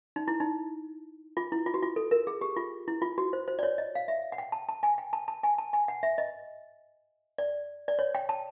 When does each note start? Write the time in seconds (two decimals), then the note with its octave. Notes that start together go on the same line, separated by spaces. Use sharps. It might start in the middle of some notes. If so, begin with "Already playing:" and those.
0.16 D#4
0.28 E4
0.40 D#4
1.37 F4
1.52 E4
1.66 F4
1.74 F#4
1.82 F4
1.96 A4
2.11 A#4
2.27 G#4
2.41 G4
2.56 F4
2.88 E4
3.02 F4
3.18 F#4
3.33 C5
3.48 C5
3.59 D5
3.63 C#5
3.78 D#5
3.95 F5
4.08 E5
4.32 F#5
4.38 G5
4.52 A5
4.69 A5
4.83 G#5
4.98 G5
5.13 A5
5.28 A5
5.43 G#5
5.58 A5
5.73 G#5
5.88 F#5
6.03 E5
6.18 D#5
7.38 D5
7.88 D5
7.99 C#5
8.15 G5
8.29 A5